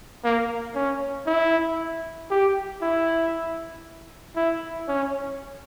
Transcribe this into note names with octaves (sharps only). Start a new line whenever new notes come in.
A#3
C#4
E4
G4
E4
E4
C#4